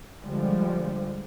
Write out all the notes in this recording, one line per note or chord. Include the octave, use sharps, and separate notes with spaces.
D3 F3 G3 G#3